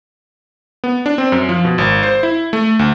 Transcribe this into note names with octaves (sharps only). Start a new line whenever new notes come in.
B3
D4
C4
F#2
F3
B2
G#1
C5
E4
A3
D2